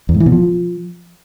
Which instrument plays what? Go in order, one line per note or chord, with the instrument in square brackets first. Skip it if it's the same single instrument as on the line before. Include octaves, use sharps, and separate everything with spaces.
[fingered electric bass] E2
G#2
E3
B2
F3